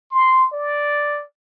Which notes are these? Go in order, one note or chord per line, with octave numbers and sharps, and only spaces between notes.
C6
D5